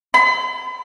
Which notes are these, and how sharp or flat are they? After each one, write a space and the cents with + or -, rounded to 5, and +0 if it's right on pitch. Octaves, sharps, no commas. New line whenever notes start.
B5 +45